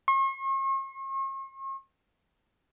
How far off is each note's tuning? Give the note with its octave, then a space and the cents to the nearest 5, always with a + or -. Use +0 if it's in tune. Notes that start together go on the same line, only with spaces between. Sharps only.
C#6 -45